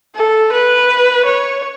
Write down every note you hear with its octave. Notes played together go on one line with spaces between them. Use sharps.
A4
B4
C#5